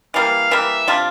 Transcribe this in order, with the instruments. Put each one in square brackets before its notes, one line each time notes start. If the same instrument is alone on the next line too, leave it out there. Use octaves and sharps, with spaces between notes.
[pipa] E3 G3 A#3 [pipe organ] F5
[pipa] E3 G3 A#3 [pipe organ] E5
[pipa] C3 G3 D4 F4